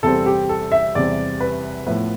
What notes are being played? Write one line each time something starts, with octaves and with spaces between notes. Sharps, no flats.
E2 C3 G3 C4 A4
G4
A4
E5
E2 C3 G3 C4 D5
B4
A2 F3 B3 B4